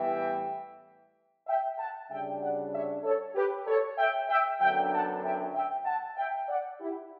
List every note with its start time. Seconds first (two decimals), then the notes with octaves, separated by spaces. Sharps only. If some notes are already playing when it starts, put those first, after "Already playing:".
Already playing: A2 E3 G3 B3 E5 G5
1.47 E5 G5
1.78 F#5 A5
2.09 D2 C#3 G3 D4 E5 G5
2.41 D5 F#5
2.72 C#5 E5
3.03 A4 C#5
3.35 G4 B4
3.66 A4 C#5
3.97 E5 G5
4.29 E5 G5
4.60 F#2 D3 F#3 B3 D4 E5 G5
4.91 F#5 A5
5.22 E5 G5
5.54 E5 G5
5.85 F#5 A5
6.17 E5 G5
6.48 D5 F#5
6.80 E4 G4